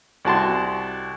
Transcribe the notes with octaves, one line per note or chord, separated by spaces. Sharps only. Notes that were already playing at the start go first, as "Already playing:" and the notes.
C2 F#4 A5 C6